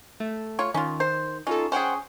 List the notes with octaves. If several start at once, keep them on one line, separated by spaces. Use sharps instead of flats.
A3
F4 C#5
D#3 C#4 F4
C5
C#4 D#4 F4 A4
C#4 G#4 C5 F#5 G5